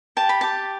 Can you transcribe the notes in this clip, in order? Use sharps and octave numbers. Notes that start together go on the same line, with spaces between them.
G4 A5
B5
G4 A5